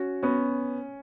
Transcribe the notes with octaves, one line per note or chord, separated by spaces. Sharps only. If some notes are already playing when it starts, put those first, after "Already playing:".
Already playing: C#4 F#4
B3 C#4